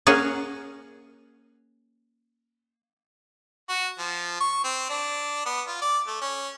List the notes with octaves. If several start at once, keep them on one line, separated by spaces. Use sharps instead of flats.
A#3 C#4 G#4 F#5
F#4
F3
C#6
C4
D4
B3
F4
D5
A3
C#4